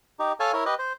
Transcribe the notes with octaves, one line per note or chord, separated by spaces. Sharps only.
D#4 G4
A4 C#5 F5 G#5 A5
E4 A#4 C#5
G4 B4 D#5
C5